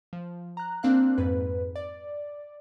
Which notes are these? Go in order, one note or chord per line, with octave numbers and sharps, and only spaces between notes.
F3
A#5 F#6
A#3 C4 D4 F5 F#6
F2 G#2 B4
D5